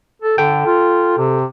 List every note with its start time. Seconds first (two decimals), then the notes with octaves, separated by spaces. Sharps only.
0.22 A4
0.38 D3 A4 G5
0.66 F4
1.18 C3